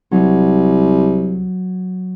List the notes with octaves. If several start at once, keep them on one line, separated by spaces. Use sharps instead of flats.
C2 F#3